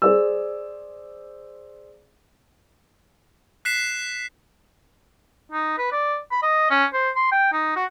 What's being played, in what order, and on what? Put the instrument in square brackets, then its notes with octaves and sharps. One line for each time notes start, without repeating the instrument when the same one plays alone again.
[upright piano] G#4 C5 D5 E6
[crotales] F#6 B6 C7 E7
[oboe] D#4
B4
D5
B5
D#5
C#4
C5
C6
G5
D#4
F#4